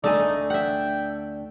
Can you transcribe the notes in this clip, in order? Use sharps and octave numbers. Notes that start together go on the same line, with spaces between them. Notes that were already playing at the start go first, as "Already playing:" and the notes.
D2 A3 D4 D#4 D5 G#5 E6
E5 F#5 G5